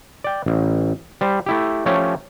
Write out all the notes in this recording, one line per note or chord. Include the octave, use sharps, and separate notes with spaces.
D5 G5
A1
G3 C5
A3 E4 G4
F3 A3 C#4 G4 C#5